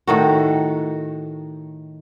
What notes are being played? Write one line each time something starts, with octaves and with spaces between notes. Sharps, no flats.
A2 D#3 F#4